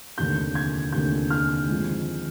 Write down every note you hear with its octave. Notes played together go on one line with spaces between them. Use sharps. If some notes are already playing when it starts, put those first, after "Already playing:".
F1 D#2 D3 G6
G#6
F1 D#2 D3 G6
F6
F2 D#3 G#3